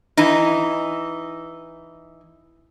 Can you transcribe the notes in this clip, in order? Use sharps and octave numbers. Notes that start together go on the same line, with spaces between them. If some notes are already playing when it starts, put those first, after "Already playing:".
E3 D#4